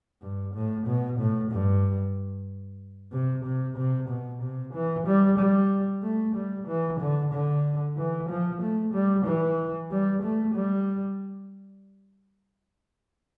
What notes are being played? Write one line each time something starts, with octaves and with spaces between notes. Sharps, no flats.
G2
A2
B2
A2
G2
C3
C3
C3
B2
C3
E3
G3
G3
A3
G3
E3
D3
D3
E3
F3
A3
G3
E3
G3
A3
G3